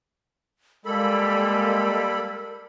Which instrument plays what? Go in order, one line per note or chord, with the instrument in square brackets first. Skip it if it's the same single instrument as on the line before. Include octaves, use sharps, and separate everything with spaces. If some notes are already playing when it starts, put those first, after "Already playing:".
[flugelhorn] G3 [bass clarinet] G#3 [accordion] A#3 A4 B5 [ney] A#4